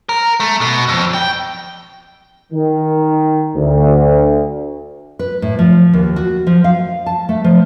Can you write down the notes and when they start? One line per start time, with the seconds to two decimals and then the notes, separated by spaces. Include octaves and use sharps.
0.09 A#4
0.40 A3
0.61 B2
0.88 F2
1.14 G5
2.53 D#3
3.56 D2
5.19 B4
5.42 A2
5.59 F3
5.93 D#2
6.16 F#4
6.47 F3
6.64 F5
7.06 A5
7.29 A3
7.44 F3